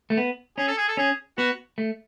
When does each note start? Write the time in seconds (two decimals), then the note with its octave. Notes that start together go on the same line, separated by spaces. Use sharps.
0.10 A3
0.17 B3
0.57 C#4 G#4
0.67 A4
0.77 G#4
0.88 A4
0.97 C#4 G#4
1.38 B3 F#4
1.78 A3